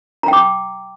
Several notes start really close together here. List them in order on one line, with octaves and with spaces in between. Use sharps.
A#5 G5 D6